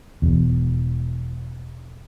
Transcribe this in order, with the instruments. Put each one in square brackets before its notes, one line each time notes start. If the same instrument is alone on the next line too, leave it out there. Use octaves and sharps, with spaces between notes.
[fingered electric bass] E1 E2